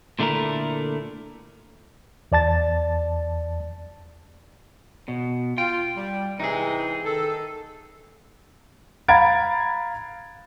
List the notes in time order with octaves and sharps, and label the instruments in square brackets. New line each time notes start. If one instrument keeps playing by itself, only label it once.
[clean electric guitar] A#2 D3 A3 E4 A#4
[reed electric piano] E2 D5 A5 A6
[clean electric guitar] B2
[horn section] F4 [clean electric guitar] G5
[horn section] G3
[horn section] C3 E3 [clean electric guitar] D#4 G#4
[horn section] D#3 A4
[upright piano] F5 A#5 B5 G#6 A6 D7